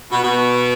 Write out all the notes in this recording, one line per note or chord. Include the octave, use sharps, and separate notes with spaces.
B2
B2